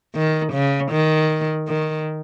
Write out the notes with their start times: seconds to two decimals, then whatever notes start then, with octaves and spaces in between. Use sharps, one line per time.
0.15 D#3
0.53 C#3
0.91 D#3
1.69 D#3